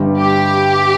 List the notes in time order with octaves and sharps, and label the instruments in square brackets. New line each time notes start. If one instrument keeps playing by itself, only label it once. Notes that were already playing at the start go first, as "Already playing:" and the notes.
Already playing: [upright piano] G1 G2 G3
[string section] G4